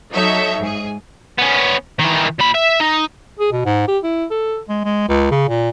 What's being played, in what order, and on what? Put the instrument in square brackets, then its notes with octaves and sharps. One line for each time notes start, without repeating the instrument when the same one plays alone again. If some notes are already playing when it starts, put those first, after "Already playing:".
[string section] F#3 D#4 A4 C#5 E5
G#2 G#4
[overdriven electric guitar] B3 C#4
D#3 E3
A#2 B5
E5
D#4
[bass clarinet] G#4
B2
G#2
G4
E4
A4
G#3
G#3
C#2
C#3
A#2